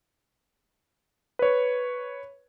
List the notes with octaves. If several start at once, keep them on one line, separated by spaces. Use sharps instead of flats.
B4 C#5